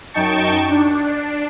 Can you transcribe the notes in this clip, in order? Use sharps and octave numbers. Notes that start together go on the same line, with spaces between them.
F#2 D#4 G5 A5 C#6
D4